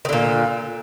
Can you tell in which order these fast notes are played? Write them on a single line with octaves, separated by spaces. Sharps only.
D#3 D3 A#2